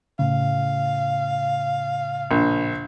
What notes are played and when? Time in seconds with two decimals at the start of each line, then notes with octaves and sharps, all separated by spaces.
0.19 A2 C#3 F5
2.31 A#1